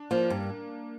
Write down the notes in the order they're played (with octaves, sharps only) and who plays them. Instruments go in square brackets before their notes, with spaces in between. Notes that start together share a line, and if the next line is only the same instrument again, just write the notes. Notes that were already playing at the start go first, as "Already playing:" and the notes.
Already playing: [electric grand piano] D4
[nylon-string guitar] F3 [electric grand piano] A#3
[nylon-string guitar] G2